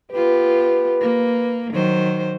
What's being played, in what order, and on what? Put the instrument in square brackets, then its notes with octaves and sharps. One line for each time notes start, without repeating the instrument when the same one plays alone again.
[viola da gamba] B3 F4 G4 [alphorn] B4
[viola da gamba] A#3
D#3 F#3 C5